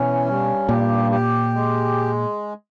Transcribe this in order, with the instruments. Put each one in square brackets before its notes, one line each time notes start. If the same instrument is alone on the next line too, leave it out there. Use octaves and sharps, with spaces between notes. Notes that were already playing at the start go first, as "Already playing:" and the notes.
Already playing: [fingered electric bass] B2 [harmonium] E3 C#4
[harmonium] G2
[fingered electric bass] A#2 [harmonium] G4
[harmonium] G4
G#3